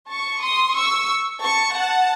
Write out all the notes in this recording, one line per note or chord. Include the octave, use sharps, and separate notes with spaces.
A5 C#6
C6 D#6
C#6 E6
A5 C#6
F#5 A5